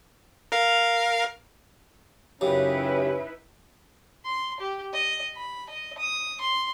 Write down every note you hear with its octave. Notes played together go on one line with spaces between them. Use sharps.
A#4 F5
F#2 C#3 C#4 D#4 E4 G4 B4
C6
G4
D#5
B5
D#5
D#6
C6